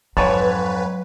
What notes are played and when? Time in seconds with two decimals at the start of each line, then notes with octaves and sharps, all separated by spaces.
0.17 F2 G#2 F#3 B4 C#5 A5